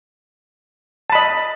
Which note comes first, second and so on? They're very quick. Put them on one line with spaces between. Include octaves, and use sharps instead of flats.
A5 B5 D#5